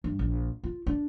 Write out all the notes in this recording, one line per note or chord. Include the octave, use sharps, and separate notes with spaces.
G2
A#1
F4
D4